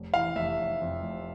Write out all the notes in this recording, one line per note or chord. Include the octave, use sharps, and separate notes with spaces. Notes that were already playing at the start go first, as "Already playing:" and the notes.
Already playing: F1
E3 F5
F1 E5
F1
F2
F1